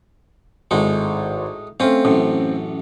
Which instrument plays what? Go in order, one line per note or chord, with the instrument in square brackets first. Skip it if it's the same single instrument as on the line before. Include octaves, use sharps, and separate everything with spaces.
[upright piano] G#1 [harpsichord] A2 G#3 D#4
[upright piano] A3 C4 [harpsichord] C#4 F4 F5
[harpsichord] A1 F#2 A2